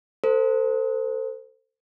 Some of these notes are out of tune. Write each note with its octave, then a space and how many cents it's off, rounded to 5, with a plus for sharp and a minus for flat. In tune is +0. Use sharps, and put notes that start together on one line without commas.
A4 +35 C5 -15